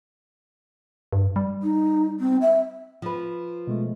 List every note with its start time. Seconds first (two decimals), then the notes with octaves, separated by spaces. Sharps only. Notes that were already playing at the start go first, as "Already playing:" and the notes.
1.13 G2
1.36 G3
1.63 D#4
2.20 C4
2.41 E5
3.02 F3 B4
3.67 B2 G#3 A3